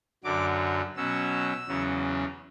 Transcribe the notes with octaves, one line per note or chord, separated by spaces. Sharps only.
F#2 D3 F#3 D6
B2 F#3 C#4 E6
E2 C#3 F#3 C#4